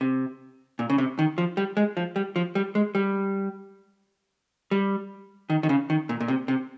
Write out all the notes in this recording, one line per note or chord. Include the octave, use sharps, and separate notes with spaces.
C3
A#2
C#3
C3
D#3
F3
G3
G#3
F3
G3
F3
G3
G#3
G3
G3
D#3
D#3
C#3
D#3
A#2
A#2
C3
C3